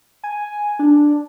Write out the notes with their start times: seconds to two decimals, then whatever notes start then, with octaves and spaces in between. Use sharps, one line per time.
0.24 G#5
0.79 D4